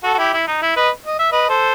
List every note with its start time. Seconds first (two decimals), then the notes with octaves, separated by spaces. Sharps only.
0.04 F#4 A4
0.14 F#4
0.18 E4 G4
0.33 E4
0.48 D#4
0.62 E4
0.76 B4 D#5
1.06 D#5
1.19 E5
1.32 B4 D#5
1.49 A4 C5